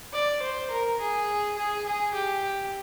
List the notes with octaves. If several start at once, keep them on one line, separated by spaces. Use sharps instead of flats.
D5
C5
A#4
G#4
G#4
G#4
G4